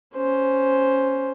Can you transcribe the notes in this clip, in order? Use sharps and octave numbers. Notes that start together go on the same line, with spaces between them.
C#4 C5